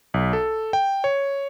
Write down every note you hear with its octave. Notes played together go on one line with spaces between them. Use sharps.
B1
A4
G5
C#5